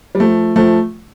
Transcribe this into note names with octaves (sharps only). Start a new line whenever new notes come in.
G3
F3 A3
F3 A3